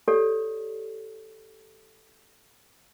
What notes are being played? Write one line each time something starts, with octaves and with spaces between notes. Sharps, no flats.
G4 A4 C#5 D5